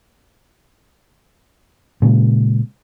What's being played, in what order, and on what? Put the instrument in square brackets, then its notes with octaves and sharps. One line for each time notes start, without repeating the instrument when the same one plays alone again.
[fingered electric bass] A#2 C#3 G#3